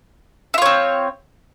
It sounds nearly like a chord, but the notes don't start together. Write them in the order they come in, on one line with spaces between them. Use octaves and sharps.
E4 F4 C#5 C4